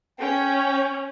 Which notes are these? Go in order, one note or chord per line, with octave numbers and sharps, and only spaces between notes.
C#4 G5